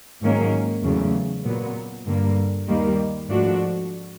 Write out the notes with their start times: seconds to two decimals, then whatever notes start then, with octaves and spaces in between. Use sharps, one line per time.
0.22 G#2 D#3 F#3 A#3 C#4
0.82 E2 C#3 F#3 A3
1.44 A#2 F#3 B3
2.06 G2 D3 G3 A#3
2.68 D#2 D#3 G3 A#3
3.28 G#2 F3 A3 D4 F#4